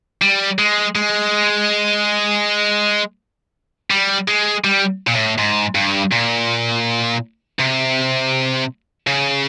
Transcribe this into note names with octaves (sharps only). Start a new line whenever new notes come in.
G3
G#3
G#3
G3
G#3
G3
A#2
A2
G#2
G2
A#2
C3
C#3